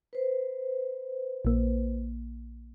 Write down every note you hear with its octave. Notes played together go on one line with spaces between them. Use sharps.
B4 C5
A#1 A#3